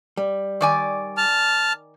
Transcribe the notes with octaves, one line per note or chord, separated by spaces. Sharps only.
G3
D#3 D5 G#5
A5 F6